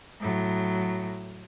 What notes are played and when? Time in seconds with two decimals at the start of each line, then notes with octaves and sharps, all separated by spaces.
0.21 A2 F#3